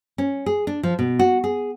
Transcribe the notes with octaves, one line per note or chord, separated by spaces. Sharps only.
C#4
G#4
D4
F3
B2
F#4
G#4